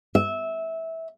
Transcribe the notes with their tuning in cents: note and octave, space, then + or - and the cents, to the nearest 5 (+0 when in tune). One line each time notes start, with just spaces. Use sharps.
E5 -15